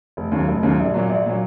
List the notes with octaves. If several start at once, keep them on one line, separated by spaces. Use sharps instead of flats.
F1
D#2 C#3 F#3
F1
D#2 C#3 F#3
A#1
A#2 F#3
A#1
A#2 F#3